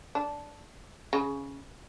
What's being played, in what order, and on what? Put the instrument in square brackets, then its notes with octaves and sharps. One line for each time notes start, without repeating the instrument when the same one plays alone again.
[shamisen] D4
C#3